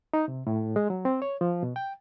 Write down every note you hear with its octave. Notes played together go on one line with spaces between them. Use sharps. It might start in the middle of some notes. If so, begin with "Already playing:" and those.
D#4
C3
A2
G#3
F#3
C4
C#5
F3
B2
G5